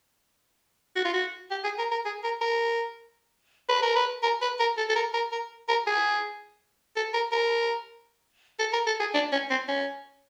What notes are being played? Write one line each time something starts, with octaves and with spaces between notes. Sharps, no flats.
F#4
F4
F#4
G4
G#4
A#4
A#4
G#4
A#4
A#4
B4
A#4
B4
A#4
B4
A#4
A4
A4
A#4
A#4
A#4
A#4
G#4
A4
A#4
A#4
A4
A#4
A4
G#4
D4
C#4
C4
C#4